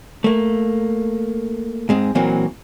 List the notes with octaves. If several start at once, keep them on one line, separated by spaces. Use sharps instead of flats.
A3 A#3
G#2 G#3 C4
A#2 E3 F#3 A#3 C4